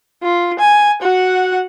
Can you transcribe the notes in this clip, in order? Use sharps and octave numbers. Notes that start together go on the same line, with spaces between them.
F4
G#5
F#4 F#5